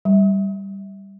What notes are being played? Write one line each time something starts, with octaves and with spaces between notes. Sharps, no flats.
G3